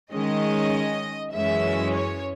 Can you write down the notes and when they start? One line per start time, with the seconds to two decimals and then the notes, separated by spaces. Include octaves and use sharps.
0.12 D#3 G#3 C#4 D#5
1.32 F#2 E3 G#3 C#4 E5
1.93 C#5